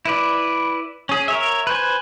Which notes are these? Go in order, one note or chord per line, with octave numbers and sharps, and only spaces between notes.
E4 B4 D5
C#4 G#4
A#4 C#5 E5
B4 C5 G#5